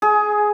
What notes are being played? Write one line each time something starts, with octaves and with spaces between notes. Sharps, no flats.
G#4